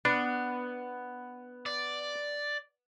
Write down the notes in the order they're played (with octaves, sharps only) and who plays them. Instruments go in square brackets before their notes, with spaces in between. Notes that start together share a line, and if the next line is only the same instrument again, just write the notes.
[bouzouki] B3 [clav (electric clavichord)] D4
[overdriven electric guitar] D5